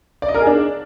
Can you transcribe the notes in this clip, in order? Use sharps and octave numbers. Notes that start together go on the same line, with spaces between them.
D5
D#5
A#4
G#4
D4